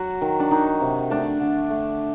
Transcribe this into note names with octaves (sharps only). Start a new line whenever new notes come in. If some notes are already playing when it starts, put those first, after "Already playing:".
Already playing: F#3 F#4
D#3
D4
D#3 D#4
C3
A3 D4
D3
A3